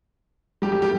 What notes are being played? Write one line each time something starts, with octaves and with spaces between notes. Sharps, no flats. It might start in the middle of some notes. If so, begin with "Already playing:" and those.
G3 G4
G3 G4
G3 G4